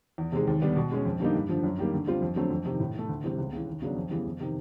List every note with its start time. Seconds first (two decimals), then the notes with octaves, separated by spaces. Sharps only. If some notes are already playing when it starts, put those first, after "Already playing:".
0.18 E2
0.32 C3 D#3 G#3
0.47 D#2
0.62 D3 G3 B3 D4
0.76 B2
0.91 G#3 C#4
1.05 F2
1.20 D3 G3 A#3 D#4
1.35 G2
1.49 D3 F3
1.63 F#2
1.78 D#3 G3 A#3
1.92 D3
2.07 G3 C4 F4
2.22 F2
2.36 D3 F#3 A3 C4
2.51 F2
2.66 C3 D#3
2.80 A2
2.94 E3 A3
3.09 D2
3.24 C3 E3 G3 C4
3.38 C#2
3.53 C#3 E3
3.67 D#2
3.82 C#3 F#3 B3 D4
3.96 F2
4.11 C#3 E3 G3 B3
4.25 F2
4.40 C3 D#3